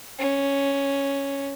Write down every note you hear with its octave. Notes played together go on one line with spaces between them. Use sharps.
C#4